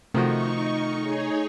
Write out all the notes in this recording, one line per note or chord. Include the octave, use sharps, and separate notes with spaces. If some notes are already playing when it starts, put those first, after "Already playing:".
C3 D#3 F3 A3 D#4 F#4 C#6
D#4 G#4 C#5